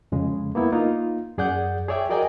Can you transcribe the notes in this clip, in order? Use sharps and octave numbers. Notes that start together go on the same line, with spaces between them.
F2 C#3 G#3
A#3 B3 E4
A#3 D#4 F4
F#2 G#4 D5 F#5 G6
G#4 C#5 D5 E5 G5
F#4 A#4 D5 D#5 G5 G#5